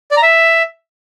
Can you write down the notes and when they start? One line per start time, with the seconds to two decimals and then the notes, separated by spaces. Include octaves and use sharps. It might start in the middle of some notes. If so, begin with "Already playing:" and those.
0.11 D5
0.17 A#5
0.22 E5